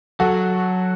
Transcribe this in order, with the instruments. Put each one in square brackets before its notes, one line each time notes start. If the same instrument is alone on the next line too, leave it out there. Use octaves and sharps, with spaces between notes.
[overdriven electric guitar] F#3 [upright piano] F#4 A4